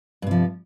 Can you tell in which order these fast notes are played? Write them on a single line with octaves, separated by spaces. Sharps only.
G2 C3 F3